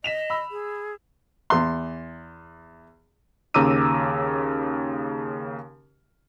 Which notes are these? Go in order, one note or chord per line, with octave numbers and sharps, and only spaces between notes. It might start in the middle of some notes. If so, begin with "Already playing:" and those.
D#5 B6 E7 F7
B5 E6
G#4
E2 C6
D#2 C#3 A#5 D6 E6 D#7